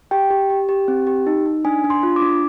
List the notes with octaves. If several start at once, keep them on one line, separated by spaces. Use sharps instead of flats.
G4 G5
G4
G4
G4
C4
G4
D#4
D#4
D4 G#5
D4
C6
F4
D6
D4